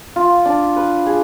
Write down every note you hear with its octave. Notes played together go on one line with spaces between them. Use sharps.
F4
D4
B4
G#4